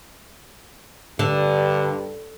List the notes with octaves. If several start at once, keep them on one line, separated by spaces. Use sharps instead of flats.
G2 D3